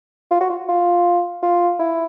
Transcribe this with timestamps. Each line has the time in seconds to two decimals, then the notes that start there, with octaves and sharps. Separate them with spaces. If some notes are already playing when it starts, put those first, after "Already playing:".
0.31 F4
0.41 F#4
0.50 F4
0.69 F4
1.43 F4
1.79 E4